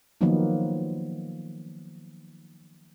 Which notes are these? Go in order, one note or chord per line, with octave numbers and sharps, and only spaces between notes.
D#3 F3 F#3 A#3 B3 D#4